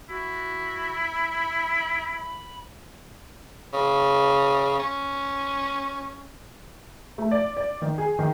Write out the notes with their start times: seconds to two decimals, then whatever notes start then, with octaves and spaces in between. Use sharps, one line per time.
0.09 E4 F#4
0.98 B5
3.73 C#3
4.79 C#4
7.18 A3
7.31 D5
7.57 D5
7.82 D#3
7.98 G#4
8.19 D#3